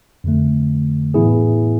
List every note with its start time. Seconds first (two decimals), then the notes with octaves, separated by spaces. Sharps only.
0.24 F2 D3 A3
1.14 A2 E3 B3 E4 G#4